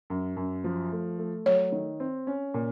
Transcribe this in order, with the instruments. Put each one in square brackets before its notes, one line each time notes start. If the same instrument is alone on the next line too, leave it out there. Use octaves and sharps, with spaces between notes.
[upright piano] F#2
F#2
F3
A3
A3
[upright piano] F#3 [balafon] C#5
[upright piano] D#3
C4
C#4
A#2